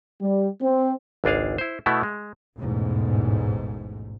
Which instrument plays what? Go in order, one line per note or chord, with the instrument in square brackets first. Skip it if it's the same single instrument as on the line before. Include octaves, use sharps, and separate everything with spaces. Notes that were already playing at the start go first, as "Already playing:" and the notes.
[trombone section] G3
C4
[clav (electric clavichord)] G#1 C#2 D4 G#4 F5
E4 C5
B2 A3 B3 E4
G#3
[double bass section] A1 E2 G#2 B2